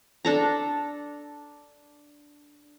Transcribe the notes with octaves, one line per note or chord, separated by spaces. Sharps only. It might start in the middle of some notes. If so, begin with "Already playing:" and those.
D4 A4 A#5